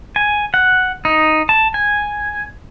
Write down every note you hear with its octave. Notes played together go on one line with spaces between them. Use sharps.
G#5
F#5
D#4
A5
G#5